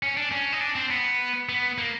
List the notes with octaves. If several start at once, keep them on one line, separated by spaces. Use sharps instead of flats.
C#4
D4
C#4
D#4
D4
C4
B3
B3
A#3